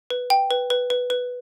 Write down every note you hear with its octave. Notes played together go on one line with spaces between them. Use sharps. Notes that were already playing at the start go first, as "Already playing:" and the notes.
B4
G5
B4
B4
B4
B4